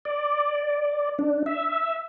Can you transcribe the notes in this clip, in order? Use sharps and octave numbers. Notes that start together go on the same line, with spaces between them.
D5
D4
E5